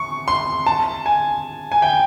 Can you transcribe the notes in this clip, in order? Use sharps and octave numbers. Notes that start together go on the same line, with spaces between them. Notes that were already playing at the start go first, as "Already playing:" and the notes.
Already playing: C#6
C6
A5
G#5
G#5
G5